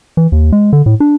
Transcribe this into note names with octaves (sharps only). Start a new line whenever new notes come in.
E3
D#2
G#3
D3
A2
D4